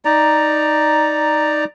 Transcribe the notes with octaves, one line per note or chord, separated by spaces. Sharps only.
D#4 D5 A#5